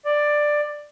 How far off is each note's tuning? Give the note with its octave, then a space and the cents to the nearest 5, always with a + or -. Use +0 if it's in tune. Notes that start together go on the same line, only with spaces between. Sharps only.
D5 +10